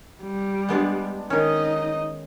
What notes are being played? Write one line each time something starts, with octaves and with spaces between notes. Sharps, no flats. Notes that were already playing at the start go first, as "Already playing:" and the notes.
G3
G#3 B3 D4
D#3 C#4 D#4 D#5